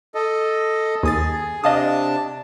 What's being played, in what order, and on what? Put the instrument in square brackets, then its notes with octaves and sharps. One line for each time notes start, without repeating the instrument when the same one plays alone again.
[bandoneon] A4 D#5
[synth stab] D#2 D#6 A6 [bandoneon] G#4
[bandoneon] C3 D4 A5 [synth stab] D#5 F5 D#6